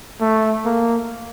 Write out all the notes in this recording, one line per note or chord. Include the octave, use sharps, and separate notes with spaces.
A3
A#3